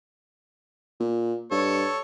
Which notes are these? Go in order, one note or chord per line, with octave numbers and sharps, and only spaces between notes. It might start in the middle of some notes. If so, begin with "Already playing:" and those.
A#2
G2 A4 C#5